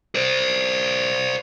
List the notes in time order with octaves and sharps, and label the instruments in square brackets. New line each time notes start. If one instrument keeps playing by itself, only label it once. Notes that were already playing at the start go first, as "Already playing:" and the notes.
[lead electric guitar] C5 D5